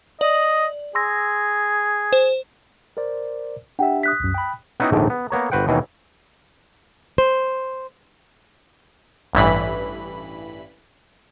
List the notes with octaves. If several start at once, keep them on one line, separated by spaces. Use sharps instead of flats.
D5 D#5
G#4 C6 E6 A#6
C5
A#4 C5 D5
D4 G4 E5 F#5 G5
D#6 F#6 B6
C2 F#2
G5 B5
B3 C#4 D#4 E4 F#4 G5
A#1 D#2 G#2 D3 A3
B3
A#3 B3 C#5 A#5
G1 F#4 B4 C5 F#5 G5
D#2 B2 E3 A3 C#4 D#4
C5
A1 G2 E3 B5